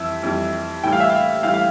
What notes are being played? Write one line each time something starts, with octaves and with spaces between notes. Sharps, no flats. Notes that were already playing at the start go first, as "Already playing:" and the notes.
Already playing: F2 E3 G3 E5
F2 E3 G3
A2 E3 G3 G5
F5
E5
F5
A2 E3 G3 F5
F5